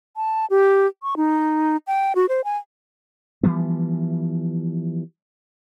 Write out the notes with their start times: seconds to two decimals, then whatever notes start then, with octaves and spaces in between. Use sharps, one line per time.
0.16 A5
0.50 G4
1.03 C#6
1.17 D#4
1.87 G5
2.15 F#4
2.29 C5
2.44 G#5
3.43 E3 F3 G3 B3